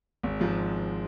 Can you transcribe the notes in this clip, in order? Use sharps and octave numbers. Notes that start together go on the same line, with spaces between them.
G#1
G#2 F3 G#3